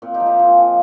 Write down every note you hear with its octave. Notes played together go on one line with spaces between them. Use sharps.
A#2 C4
D#4 G4
F3
D#4 G4
A#2 F4 G#4
F3